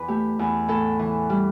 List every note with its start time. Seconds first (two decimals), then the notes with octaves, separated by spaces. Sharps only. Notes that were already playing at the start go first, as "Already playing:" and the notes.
Already playing: E2 B4 D5
0.08 A3 G4
0.39 E2
0.68 A2 A4
0.99 E3
1.30 G3